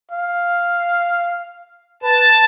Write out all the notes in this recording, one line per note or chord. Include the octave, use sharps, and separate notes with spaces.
F5
B4 A5